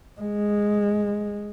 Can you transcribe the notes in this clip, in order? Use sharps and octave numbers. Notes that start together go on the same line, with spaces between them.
G#3